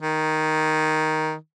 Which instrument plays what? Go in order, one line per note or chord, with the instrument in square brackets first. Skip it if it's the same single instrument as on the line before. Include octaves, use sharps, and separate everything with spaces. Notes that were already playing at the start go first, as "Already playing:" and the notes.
[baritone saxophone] D#3